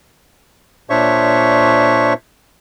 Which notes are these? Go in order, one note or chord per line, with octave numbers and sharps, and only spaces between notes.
A#2 D4 C5 C#5 E5 C#6